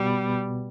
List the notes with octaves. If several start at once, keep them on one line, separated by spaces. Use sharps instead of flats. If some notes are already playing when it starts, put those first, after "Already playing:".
Already playing: B2 G3 B3